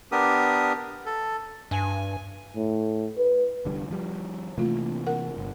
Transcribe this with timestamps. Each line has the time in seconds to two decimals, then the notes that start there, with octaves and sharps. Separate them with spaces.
0.12 B3 D4 G4 A#4 D#6
1.06 A4
1.71 G2 G#5
2.56 A2
3.18 B4
3.65 F1 D3 G3
3.91 F3 G3
4.58 C3 E3 A3 A#3 F4
5.07 A#4 F#5
5.37 G1